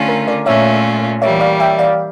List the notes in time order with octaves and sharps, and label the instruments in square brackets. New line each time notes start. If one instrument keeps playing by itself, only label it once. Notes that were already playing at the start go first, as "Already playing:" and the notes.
Already playing: [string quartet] D3 A3 C#4 F4
[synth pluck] A#4
A#4 D5
[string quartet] A#2 A3 C#4 F4 [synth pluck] C#5 E5
[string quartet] E3 G3 A#3 [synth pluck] C#5 E5
[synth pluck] D5 F5
E5 G5
D5 F5